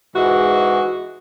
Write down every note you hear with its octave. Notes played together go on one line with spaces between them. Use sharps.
G#2 E3 G#3 F#4